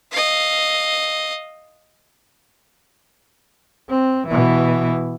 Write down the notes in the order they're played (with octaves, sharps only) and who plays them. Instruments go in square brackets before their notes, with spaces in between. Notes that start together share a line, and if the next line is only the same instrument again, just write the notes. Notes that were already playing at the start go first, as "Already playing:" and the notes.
[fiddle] D#5 F5
[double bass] C4
B2 E3